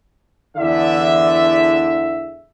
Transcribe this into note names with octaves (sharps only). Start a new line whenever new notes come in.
E2 D3 E5